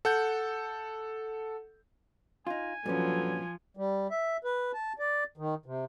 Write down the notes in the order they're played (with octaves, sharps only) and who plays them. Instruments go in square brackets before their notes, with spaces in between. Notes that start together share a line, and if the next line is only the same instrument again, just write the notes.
[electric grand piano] A4 F#5 G6
[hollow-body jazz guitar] D#4 F4 [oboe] G#5
[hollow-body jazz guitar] G2 A#2 C#4 [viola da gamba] F3 [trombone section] F#3 A4 B4
[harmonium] G3
E5
B4
A5
D5
D#3
C3